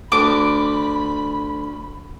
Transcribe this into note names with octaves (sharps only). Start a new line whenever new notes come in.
D2 B5 D6